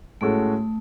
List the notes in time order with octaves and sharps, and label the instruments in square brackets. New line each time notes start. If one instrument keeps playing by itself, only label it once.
[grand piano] A2 G#3 C#4 F#4 A4 [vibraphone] A3